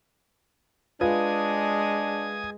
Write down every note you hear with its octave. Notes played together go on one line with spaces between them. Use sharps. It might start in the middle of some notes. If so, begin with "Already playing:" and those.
G#3 D4 F4 B4 G#5 D#6